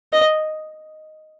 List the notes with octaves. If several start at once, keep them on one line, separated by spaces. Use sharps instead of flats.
D#5